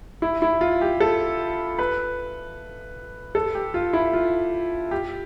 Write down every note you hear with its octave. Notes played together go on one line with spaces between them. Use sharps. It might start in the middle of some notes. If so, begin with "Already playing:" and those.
E4
E4
F4
G4
A4
B4
A4
G4
F4
E4
F4
G4